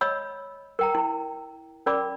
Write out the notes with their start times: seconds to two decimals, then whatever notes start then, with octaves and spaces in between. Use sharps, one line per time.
0.01 C#5 D#5 B5 E6
0.79 A#4 G5 A#5
0.95 E4
1.86 C#4 A#4 D5 B5 D6